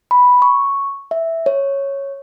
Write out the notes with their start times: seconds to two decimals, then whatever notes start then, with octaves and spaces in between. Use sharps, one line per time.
0.11 B5
0.42 C#6
1.11 E5
1.46 C#5